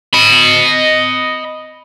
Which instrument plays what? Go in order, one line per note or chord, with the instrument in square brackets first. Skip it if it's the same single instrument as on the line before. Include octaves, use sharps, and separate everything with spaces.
[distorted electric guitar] D#5 B5